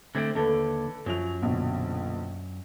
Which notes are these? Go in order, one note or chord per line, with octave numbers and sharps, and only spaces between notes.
D3 A3 C4 G#6 D7
D#2 D3 A4 B4
F#2 F3 F#3 F7
A#1 B2 D3